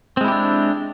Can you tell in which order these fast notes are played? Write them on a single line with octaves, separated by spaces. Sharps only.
C4 G#3 E4 G4 D4